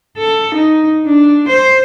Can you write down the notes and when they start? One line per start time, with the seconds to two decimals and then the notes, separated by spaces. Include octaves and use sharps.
0.18 A4
0.55 D#4
1.07 D4
1.49 C5